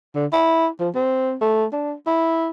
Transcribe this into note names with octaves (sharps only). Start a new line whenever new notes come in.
D3
E4
F3
C4
A3
D4
E4